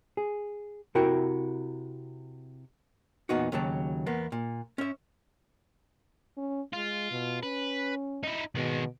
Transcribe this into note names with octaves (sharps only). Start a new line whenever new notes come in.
G#4
C3 E4 F#4 A#4 G5
E2 A#2 B3 D#4 F#4
D#2 C#3 F#3 A5
E2 A#3 B3
A#2
C#4 E5
C#4
G#3 F4
B2
C#4 B4
D#4 E4
B2 D#3 G#3